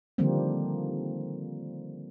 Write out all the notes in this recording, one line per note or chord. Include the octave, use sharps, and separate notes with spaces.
D3 D#3 F3 G3 A#3 C4